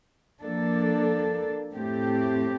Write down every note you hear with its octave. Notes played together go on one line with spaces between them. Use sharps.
F3 A#3 D4 A4
A2 A3 C4 G4